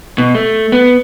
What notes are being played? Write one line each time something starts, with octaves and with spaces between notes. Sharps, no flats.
B2
A3
B3